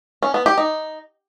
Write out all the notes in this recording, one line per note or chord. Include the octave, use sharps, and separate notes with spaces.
C#4
B3
G4
D#4